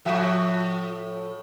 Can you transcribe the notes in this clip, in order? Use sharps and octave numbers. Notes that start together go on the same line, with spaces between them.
A2 F3 E5